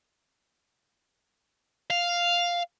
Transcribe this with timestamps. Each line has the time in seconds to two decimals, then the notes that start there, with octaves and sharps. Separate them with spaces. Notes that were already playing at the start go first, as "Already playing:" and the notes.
1.90 F5